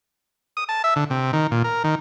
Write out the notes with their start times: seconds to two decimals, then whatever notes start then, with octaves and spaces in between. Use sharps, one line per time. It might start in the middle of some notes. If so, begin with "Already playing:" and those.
0.57 D#6
0.69 A5
0.84 E5
0.96 D3
1.10 C3
1.33 D#3
1.51 A#2
1.64 A#4
1.84 D#3